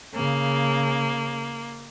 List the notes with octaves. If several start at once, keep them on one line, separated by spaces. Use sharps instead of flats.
C#3 A#3